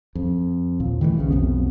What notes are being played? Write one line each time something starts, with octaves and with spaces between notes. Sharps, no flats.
F2
D#2 A#2
D#3 E3 G3 A3
F1 B1 A2 C#3
F1 B1 F2 B3